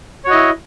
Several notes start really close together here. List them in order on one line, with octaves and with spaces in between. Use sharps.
C#5 F#4 D#5 E4